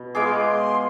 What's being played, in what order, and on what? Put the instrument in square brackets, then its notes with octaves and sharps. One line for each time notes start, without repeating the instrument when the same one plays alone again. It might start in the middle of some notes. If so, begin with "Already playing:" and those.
Already playing: [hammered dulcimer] B2
[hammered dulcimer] G#3 B3 F4 G#4 [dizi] D6
[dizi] C6
D6
C6